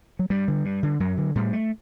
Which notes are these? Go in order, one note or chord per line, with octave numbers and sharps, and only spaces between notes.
F#3
G2 G3
D3
G2
D3
F#2 F#3
D3
A2 G3
A3